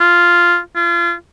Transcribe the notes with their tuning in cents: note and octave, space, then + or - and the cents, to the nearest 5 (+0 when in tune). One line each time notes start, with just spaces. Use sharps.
F4 -5
F4 -30